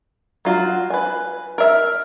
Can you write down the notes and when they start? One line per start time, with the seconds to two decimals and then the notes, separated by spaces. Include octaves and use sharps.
0.45 F#3 F4 F#4
0.90 B4 G#5
1.58 A#4 E5